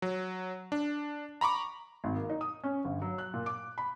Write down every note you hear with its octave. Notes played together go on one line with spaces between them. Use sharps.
F#3
D4
A#5 B5 C#6 D6
G#1
A#3
D#4
D#6
C#4
G1
F#3
F#6
A#2
D6
B5